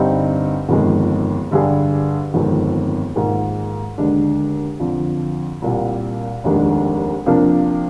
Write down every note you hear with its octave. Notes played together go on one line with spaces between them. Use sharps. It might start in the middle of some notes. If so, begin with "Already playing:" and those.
Already playing: G2 D3 G3 C4 D#4
G1 F2 D#3 G#3
G2 D3 G3 D4 G#4
G1 F2 D#3 G#3 C4
G#2 D#3 A#3 F4 G#4
D#2 D3 G#3 D4
F2 D3 F3
C2 A#2 G3 A#3
F1 D#2 D#3 G#3 D4
C3 F3 A#3 D4